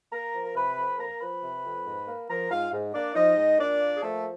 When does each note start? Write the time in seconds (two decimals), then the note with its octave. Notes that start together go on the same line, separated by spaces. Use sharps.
0.11 A#3 A#4 A#5
0.33 F3
0.44 A#5
0.54 C3 B4 B5
0.76 F2
0.98 A#3 A#4 A#5
1.20 F3 B4 B5
1.42 C3
1.63 F2
1.85 G#2
2.07 A#3
2.28 F3 A#4 A#5
2.50 G#2 F4 F5
2.72 G#2
2.93 A#3 D4 D5
3.15 F3 D#4 D#5
3.37 G#2
3.58 A#2 D4 D5
3.80 A#3
3.95 G#4
4.01 F3 A3 A4